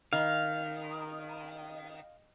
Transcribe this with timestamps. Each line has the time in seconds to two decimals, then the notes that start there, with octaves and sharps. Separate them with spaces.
0.13 D#3 F5